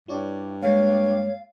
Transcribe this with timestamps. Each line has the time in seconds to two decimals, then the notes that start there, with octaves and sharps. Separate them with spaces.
0.08 G2 E4 C#5 D5
0.63 G#3 A#3 C#5 F5